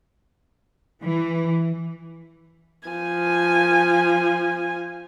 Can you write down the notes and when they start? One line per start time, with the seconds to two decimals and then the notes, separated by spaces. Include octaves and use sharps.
1.04 E3
2.88 F3 G#5